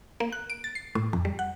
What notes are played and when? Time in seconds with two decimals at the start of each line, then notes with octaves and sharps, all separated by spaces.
0.20 A#3
0.32 F#6
0.50 D7
0.64 A6
0.75 C7
0.95 A2
1.13 F2
1.25 G3
1.39 F#5